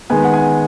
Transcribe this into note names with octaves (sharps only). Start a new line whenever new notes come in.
D#3 G#3 B3 G#5
F#5
G#5